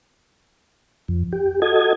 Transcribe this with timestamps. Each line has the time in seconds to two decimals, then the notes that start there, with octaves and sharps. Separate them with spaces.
1.08 F2
1.33 G4
1.62 F#4 A4 D#5 G#6